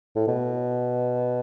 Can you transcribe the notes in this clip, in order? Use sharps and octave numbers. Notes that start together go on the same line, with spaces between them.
A2
B2